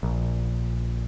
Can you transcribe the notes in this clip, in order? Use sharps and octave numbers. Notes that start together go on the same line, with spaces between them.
A#1